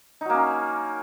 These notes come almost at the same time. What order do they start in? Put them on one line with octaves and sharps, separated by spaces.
D#4 F#3 A#3 C#4